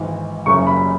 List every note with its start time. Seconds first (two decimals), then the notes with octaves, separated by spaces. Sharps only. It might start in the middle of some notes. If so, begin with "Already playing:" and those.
Already playing: G#1 G#2 E3
0.46 F#1 F#2 C#3 C#6
0.67 B5